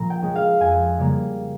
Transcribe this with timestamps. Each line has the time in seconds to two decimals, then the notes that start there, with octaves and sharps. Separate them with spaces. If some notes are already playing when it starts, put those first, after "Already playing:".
Already playing: A#2 F3 A#3 A#5
0.10 G5
0.22 G#3 C#4
0.35 F5
0.60 F2 G#5
0.98 C#3 G3 A#3